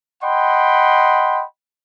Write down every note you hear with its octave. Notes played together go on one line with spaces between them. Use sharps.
D#5 F#5 G5 B5 C6